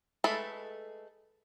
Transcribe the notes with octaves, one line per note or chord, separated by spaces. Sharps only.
G#3 A3 A4 B4 B5